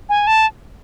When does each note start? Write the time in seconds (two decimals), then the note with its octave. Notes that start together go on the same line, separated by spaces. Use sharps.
0.09 G#5
0.27 A5